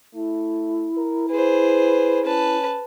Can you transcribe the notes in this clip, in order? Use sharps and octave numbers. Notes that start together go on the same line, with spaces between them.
A3 E4
A#4
G#4 B4 C5
C#4 B4 A5